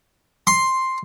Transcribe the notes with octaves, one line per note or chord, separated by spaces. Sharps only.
C6